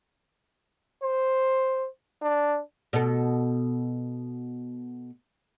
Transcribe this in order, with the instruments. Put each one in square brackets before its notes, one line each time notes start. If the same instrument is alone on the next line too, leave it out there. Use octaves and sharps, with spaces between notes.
[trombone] C5
D4
[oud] B2 A4